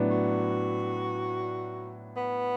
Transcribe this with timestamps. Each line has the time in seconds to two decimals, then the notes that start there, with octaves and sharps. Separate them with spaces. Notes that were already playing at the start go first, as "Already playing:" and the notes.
Already playing: A2 F#3 B3 D4
0.10 F#4
2.16 B3